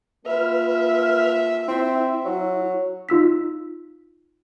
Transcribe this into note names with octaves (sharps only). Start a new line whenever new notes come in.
A#3 F4 B4 E5 F6
C4 E4
F#3
D#4 F4 E6 B6